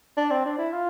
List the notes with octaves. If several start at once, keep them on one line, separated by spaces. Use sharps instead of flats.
D4
C4
D4
E4
F4